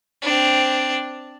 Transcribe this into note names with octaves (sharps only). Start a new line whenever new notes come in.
C4 D4